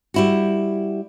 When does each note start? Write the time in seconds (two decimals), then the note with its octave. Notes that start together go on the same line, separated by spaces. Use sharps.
0.14 G3 E4 F#4